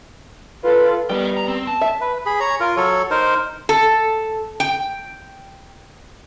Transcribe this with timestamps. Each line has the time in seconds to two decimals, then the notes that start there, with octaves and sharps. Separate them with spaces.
0.64 F4 A4 B4
1.09 G3 B3 D#5 G5
1.37 A#5
1.48 C4
1.67 A5
1.81 E5
2.01 B4
2.26 G#4 B5
2.40 C#5 A#5
2.60 F4 A#4
2.77 F#3 A4 C#5
3.11 D#4 A#4 C5
3.69 A4
4.60 G5